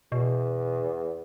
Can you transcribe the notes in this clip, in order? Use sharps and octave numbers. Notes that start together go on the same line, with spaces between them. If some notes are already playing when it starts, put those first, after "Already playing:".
E2 B2